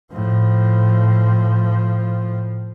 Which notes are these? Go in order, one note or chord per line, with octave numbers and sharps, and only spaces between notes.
A2 F3